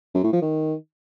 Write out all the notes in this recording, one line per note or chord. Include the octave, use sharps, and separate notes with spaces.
F#2
A2
F3
D#3